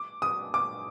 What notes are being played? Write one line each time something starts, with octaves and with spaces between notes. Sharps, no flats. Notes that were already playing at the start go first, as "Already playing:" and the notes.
Already playing: D6
D#6
D6